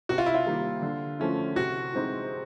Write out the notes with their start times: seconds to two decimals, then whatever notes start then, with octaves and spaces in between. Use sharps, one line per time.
0.09 C3 F#4
0.18 F4
0.26 E4
0.34 F4
0.46 D#3 G3 A#3
0.82 D3
1.19 F3 A3 C#4 E4
1.56 C3 F#4
1.93 E3 G#3 C4 D#4